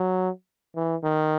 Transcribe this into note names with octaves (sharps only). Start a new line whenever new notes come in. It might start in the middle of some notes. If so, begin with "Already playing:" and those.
Already playing: F#3
E3
D#3